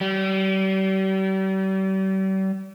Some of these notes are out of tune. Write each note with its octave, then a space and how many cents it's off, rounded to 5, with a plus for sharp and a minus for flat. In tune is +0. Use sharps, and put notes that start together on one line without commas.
G3 -40